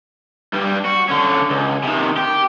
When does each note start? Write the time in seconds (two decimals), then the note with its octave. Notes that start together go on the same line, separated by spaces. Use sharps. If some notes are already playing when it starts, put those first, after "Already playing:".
0.54 G2 G3
0.85 F#4
1.09 D3 C#4
1.50 C#2
1.83 C3 D#3
2.17 G4